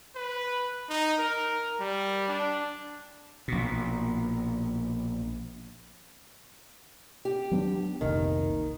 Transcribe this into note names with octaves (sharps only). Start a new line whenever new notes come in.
B4
D#4
A#4
G3
D4
A#1 B2
G4
F#3 B3 D4
F1 C2 A#2 D#3